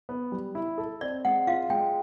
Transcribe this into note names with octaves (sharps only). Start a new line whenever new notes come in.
B3
G3
E4
A4
C4 D5
G#3 F#5
F4 F5
G#3 G5